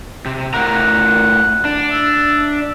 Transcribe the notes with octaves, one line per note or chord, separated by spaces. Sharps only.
C3
A2 A#4 F#5 A#5
D4
E5